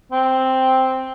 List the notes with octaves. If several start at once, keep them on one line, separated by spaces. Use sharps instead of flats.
C4